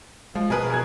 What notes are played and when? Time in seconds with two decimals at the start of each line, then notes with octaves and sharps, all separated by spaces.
0.35 F3 G#3
0.50 B2 G#4 A#4 B4
0.70 E1 G#4 G#6